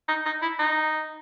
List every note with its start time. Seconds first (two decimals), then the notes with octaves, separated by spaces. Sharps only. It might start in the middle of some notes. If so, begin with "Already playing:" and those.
0.08 D#4
0.26 D#4
0.42 E4
0.59 D#4